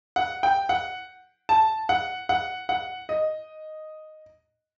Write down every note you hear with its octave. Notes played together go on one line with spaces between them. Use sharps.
F#5
G5
F#5
A5
F#5
F#5
F#5
D#5